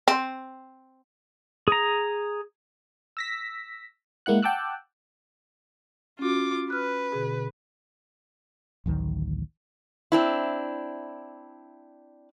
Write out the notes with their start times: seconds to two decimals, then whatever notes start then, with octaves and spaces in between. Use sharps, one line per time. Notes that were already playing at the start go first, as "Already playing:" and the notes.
0.08 C4
1.68 G#4 A#5
3.17 E6 A#6 B6
4.26 G#3 A#3 E4 F#5 F#6
4.42 F#5 G5 A5 D6 E6 F#6
6.19 C#4 F4 F#4 D6
6.70 B4 F6 F#6
7.12 B2 D3 G#4
8.86 A1 D2 D#3 F#3
10.12 C4 D4 E4